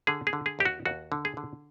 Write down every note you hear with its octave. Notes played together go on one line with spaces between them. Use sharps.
D3 G#4
G#4
D3
G#4
D#2 G4
F#4
D#2 F#4
D3
G#4
D3